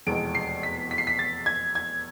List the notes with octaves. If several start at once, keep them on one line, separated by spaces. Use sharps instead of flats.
F1 E2 B2 G#3 D7
C7
B6
B6
C7
B6
A6
G#6
G#6